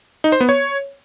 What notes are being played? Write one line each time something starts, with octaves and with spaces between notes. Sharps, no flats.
D#4
C5
B3
C#5